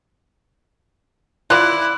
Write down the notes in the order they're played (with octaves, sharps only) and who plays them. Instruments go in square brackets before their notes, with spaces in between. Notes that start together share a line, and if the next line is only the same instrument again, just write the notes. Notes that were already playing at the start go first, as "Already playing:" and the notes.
[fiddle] E4 [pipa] F4 D5 [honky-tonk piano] F#6